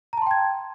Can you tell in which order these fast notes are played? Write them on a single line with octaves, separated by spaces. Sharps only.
A#5 A5 C6 G5 G#6